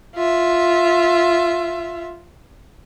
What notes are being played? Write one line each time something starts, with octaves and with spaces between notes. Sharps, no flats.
F4 E5